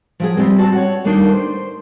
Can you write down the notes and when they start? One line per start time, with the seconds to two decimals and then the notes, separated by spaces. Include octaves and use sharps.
0.20 F3 F#3 G#4
0.37 G3 G#3 C4
0.58 C4 F#4 A5
0.73 C#5 F#5
1.04 D#3 G3 A3 A#3 D4 D#4
1.33 C5